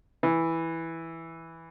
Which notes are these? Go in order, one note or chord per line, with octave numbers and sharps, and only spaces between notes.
E3